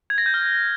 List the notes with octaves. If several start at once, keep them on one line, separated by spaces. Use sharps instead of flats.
G#6
A#6
G6
F6